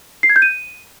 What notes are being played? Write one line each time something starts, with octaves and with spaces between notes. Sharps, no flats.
C7
G#6
G6
D#7